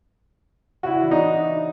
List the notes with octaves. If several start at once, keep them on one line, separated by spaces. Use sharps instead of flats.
C#3 C#4 E4 F#4
E3 D4
D#4